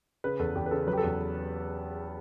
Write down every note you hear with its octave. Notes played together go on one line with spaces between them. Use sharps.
C#3 B4
E2 A4
E2 G4
B4
C#3 A4
F#3 B4
G4
A4
E2